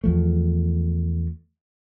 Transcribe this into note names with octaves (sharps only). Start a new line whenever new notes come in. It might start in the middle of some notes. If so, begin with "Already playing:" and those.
E2 F3 A3